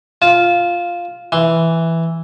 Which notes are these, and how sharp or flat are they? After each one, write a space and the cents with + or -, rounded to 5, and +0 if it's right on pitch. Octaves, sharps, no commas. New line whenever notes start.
F4 +0 A5 -25
E3 +0 C6 +0